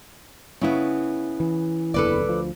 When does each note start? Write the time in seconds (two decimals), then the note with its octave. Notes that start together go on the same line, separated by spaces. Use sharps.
0.61 C#3 B3 C#4 E4
1.40 E3
1.94 F#1 E2 D3 A4 B4 D5
2.26 D2 F3